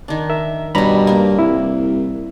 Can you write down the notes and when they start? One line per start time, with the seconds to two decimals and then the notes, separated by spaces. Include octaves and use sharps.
0.08 D#3 D4
0.29 A#4 E5
0.75 G2 B2 G3 C#5 A#5 B5
1.07 A#3 A#4
1.39 C2 E4